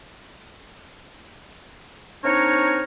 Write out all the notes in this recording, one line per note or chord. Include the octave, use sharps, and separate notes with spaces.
C4 D4 D#4 A#4 C#5